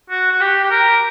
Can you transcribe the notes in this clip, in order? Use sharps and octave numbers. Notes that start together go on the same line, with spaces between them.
F#4
F#4
G4
G4
A#4